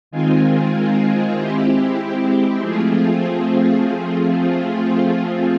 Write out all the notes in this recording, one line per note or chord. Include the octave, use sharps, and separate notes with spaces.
D#3 G#3 C4 F4 G#4
G#3 C4 E4 G4
F3 A3 C4 F4 G#4